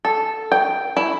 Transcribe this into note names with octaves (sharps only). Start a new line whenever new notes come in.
A4
G5
E4